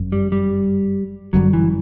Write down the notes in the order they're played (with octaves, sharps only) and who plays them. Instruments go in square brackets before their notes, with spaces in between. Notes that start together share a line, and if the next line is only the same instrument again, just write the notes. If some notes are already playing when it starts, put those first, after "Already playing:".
Already playing: [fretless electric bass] G1 F#2 F#3
[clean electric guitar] G3
G3
[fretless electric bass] G1 F#2 D3 G3 [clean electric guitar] F#3
[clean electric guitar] E3